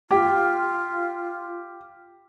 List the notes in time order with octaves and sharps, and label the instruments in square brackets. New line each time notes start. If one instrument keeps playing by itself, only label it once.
[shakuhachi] F4 [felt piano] G4